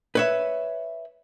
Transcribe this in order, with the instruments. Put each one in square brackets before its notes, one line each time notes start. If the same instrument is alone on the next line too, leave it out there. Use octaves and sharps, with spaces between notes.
[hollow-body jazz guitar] B4 C#5 E5